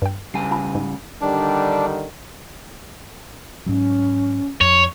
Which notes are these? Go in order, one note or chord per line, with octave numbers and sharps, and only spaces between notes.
G2 G5
C#3 G3 G#5 C7
F4 A5 B5
G#2
D3 D#3 G3 D4
G#2 F#3 C#4
F2 C#5